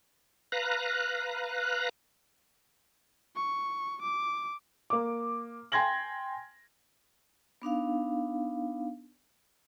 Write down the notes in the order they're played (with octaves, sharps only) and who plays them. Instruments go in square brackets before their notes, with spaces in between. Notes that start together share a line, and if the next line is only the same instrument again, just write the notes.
[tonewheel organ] B4 F5 A#5 F#6
[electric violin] C#6
D6
[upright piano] A#3 D6
G5 G#5 C6 G#6 A#6 F#7
[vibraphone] B3 D4 D#4 F5